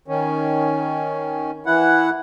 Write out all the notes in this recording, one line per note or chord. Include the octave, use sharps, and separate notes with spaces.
D#3 C#4
E3 E4 F#5